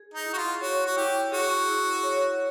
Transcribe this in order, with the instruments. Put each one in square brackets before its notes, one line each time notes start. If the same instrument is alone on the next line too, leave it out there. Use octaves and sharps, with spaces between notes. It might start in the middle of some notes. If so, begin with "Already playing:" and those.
Already playing: [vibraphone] G#4
[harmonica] D#4
[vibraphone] E4
[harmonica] F#4
F4
[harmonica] F#4 [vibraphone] C#5
[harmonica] F#4
[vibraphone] E4 [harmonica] G4
[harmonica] F#4 [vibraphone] G#4
[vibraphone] E4
C#5